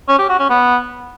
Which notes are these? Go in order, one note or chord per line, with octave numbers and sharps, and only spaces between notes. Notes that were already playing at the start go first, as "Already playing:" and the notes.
C#4
G4
F#4
C#4
B3